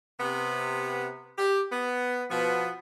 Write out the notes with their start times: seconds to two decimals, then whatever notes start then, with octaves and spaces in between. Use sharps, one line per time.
0.19 C3 B3
1.38 G4
1.72 B3
2.30 B2 F3 B3